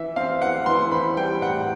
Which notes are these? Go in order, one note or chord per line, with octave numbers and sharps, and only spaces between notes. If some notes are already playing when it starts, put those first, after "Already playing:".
Already playing: E3 E5
C4 F5
E3 F#5
E3 C6
C4 B5
G3 G5
A2 F#5